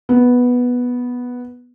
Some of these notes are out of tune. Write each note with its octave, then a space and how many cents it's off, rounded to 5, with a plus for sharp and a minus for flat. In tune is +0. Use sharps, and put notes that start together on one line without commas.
B3 -5